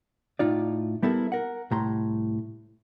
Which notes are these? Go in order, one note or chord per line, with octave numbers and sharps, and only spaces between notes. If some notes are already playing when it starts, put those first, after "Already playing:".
A2 D#4 F4 D5
G3 B3 E4 A4 A#4
A#4 F#5
C2 A2 A#5 C6